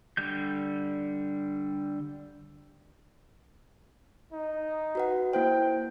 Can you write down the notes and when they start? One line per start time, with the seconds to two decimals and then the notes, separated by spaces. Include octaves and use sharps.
0.17 D3 G3 G6
4.33 D#4
4.95 F#4 B4 F#5
5.33 A#3 E4 C5 G5